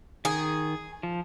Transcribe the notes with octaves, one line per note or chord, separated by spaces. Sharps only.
D#3 G#4
F3